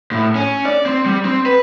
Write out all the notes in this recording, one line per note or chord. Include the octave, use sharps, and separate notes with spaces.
A2
C#4
D5
C4
G3
C4
B4